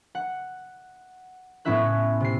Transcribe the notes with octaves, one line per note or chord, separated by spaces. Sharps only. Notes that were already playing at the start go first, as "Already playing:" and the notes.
F#5
A2 B3 C#4 E4 E5 F#6
C3 C7